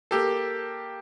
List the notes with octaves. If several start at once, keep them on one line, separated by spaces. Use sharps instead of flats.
A#3 G4 A4